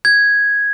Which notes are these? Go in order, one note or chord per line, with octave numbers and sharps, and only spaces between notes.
G#6